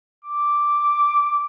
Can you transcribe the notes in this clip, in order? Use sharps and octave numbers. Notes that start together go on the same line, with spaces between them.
D6